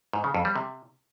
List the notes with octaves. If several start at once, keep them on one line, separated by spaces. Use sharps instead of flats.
G#2
C#3
F2
G3
C3